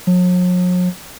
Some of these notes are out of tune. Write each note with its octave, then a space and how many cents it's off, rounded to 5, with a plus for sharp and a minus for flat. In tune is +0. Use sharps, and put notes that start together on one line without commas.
F#3 -45